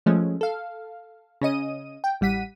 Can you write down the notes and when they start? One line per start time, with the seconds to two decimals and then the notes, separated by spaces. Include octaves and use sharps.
0.06 F3 G#3 A3 C#4
0.41 A4 F5
1.41 C#3 C#4 D#5 D#7
2.04 G5
2.21 A1 G3 F#5 B6 D#7